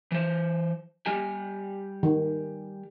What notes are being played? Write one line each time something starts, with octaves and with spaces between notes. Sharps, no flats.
E3 C5
G3 G4 G#5
D#3